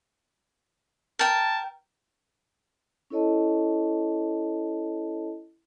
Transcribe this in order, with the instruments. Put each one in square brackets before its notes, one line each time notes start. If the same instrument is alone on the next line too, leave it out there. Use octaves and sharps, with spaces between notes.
[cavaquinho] A#4 G5 [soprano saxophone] A5
[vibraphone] C#4 E4 A4 C#5 D#5 A5